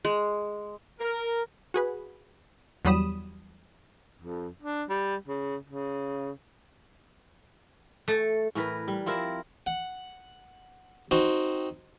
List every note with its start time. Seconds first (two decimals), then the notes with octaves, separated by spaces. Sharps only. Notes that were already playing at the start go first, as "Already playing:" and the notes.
0.05 G#3
1.00 A#4
1.74 F#4 G#4 B4
2.85 E2 F#3 G3 B5 D#6 E7
4.22 F2
4.62 D4
4.89 G3
5.27 C#3
5.69 C#3
8.08 A3
8.55 A2 E3 A#4 B4
8.88 G3
9.06 F3 C4 E4 A#4
9.66 F#5
11.11 C4 D#4 F#4